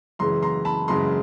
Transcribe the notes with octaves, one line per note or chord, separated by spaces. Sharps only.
F#2 C#3 E3 G#3 A#5 C6
A#5 C6
A5 B5
F#2 C#3 E3 G#3 A#5 C6